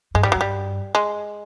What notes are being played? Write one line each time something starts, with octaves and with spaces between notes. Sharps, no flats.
G2 G#3
G#2 G3
G2 F#3
G3
G#3